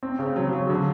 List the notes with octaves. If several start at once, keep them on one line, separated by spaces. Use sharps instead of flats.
C4
C#3
F#3
F#3
D3